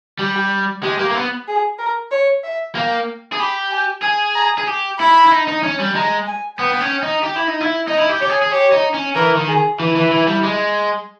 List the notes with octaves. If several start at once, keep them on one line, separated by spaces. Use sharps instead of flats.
G3 G4
G#3 G4
A#3
A#3
B3
G#4
A#4
C#5
E5
A#3 G5
G#4
G4 B5
G#5
G#4 G#5
A#5
G#4
G4
E4 B5
E4
D#4
D#4
C#4
G3
G#3 A#5
G#5
B3 G5
B3
C#4
D#4
G4
E4
D#4
E4
D#4 D#5
E4
G4
G4 C#5
G#4
G#4
G4 C#5
D#4
C#4
E3 A#4
D#3
G#4
E3 E4
E3
E3
G3
G#3